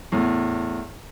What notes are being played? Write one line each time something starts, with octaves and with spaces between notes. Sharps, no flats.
E2 A2